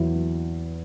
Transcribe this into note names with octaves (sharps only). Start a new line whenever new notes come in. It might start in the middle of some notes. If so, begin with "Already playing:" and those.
Already playing: E2 F#3 E4
F#3